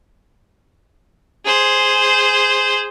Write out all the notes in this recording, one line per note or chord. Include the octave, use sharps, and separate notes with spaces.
G#4 C5